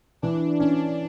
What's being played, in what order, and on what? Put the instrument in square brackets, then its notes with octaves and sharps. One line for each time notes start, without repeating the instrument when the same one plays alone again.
[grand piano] E3 [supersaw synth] D4
[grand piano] C#4 [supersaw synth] D4